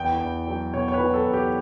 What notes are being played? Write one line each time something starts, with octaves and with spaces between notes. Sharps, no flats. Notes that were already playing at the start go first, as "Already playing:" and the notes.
Already playing: E2 G5
E2
F#3
B2 C#5
C#5
B4
F#3
A4
E2
G4